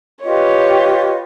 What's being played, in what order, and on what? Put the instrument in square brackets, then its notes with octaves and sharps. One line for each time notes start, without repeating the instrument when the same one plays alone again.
[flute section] F4 B4 D#5 [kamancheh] G4 C#5